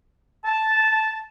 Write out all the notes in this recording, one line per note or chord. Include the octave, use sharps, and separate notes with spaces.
A5